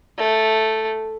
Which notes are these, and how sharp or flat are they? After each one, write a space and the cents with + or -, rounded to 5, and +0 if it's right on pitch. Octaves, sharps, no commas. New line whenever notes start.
A3 +0